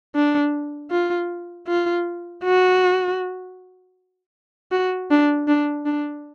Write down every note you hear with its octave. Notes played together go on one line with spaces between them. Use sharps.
D4
F4
F4
F#4
F#4
D4
D4
D4